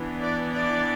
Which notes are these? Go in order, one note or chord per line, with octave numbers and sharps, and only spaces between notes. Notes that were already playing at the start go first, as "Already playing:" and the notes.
Already playing: E3 B3 D4
D5
D5